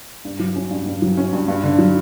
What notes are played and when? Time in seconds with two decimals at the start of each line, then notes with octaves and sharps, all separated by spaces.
0.25 G2
0.39 F#3
0.55 C#4
0.71 G2
0.86 G2
1.02 F#3
1.17 C#4
1.33 G2
1.48 G2
1.64 D3
1.78 F#3